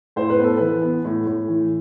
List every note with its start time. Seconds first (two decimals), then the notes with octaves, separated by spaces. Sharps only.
0.16 A2 C5
0.30 B4
0.39 B3
0.44 A4
0.57 E3 B4
0.82 B3
1.05 A2
1.26 A2
1.48 E3